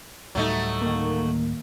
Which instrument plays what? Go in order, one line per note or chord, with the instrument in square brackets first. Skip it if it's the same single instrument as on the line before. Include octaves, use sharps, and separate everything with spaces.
[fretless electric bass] D2 A2 G3 [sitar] F#3 A3 D#4
[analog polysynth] D#3 A#3